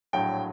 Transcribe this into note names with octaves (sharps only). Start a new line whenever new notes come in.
A#1 A2 F#3 A3 G5